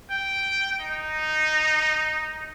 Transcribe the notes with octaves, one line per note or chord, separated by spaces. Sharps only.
G5
D#4